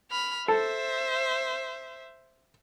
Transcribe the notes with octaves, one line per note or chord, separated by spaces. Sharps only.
B5 F6
A4 C5 E5